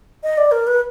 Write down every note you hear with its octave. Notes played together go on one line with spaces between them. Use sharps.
D#5
D5
A#4
B4